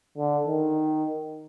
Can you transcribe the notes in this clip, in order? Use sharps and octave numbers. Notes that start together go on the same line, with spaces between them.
D3
D#3